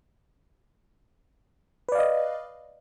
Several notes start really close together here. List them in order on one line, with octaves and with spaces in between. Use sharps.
B4 D5 F5 D#5